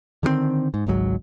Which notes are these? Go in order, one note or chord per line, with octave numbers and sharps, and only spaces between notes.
D3 D#3 G3 C4
G#2
G#1 C#2 G#2 F#3